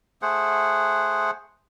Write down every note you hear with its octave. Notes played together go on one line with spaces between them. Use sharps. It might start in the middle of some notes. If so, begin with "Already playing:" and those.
A3 G#4 C5 F#5